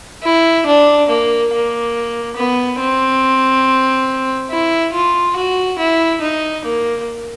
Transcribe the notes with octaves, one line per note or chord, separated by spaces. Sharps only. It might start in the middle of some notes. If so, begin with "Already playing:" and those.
E4
D4
A#3
A#3
B3
C4
E4
F4
F#4
E4
D#4
A#3